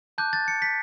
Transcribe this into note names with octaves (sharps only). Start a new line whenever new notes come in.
A5 D6 F#6 G6
A6
C#7
B6